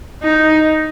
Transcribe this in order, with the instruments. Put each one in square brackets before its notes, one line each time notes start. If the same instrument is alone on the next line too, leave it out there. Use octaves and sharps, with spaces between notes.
[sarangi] D#4